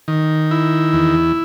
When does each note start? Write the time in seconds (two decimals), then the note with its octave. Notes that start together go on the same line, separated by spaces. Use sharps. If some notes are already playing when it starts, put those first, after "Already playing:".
0.08 D#3
0.51 E4
0.93 E2